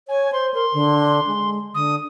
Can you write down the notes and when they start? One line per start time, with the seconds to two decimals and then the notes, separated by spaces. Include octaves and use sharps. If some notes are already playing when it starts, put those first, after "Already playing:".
0.08 C#5 G#5
0.33 C5 C6
0.54 A#4 C6
0.73 D3
1.27 G#3
1.74 D3 D#6